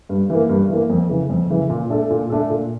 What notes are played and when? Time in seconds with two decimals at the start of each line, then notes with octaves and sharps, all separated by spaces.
0.09 G2
0.30 E3 A#3
0.49 G2
0.69 E3 A#3
0.90 F2
1.09 C#3 E3
1.30 F2
1.50 C#3 E3
1.70 A#2
1.90 A3 D4 A4
2.10 A#2
2.29 A3 D4 A4
2.50 A#2